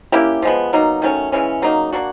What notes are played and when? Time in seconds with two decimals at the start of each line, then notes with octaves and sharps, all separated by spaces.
0.12 A#3 C#4 E4 G4
0.42 F3 G#3 B3
0.73 B2 F#3 A#3 D#4
1.02 D#3 F#3 A3 C#4
1.32 C#3 E3 G#3 C#4
1.62 C#3 F#3 A#3 D#4
1.93 A#3 D4 F#4